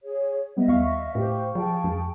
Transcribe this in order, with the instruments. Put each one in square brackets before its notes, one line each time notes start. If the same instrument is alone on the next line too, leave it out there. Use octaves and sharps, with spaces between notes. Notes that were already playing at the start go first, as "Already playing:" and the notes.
[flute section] G#4 C#5
[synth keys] G3 B3 [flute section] D#5 E5
[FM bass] D#2 [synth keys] F5 C#6
[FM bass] A2 [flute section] G4 C5 G5
[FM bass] F3 [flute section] G#4 G5 A5
[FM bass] F2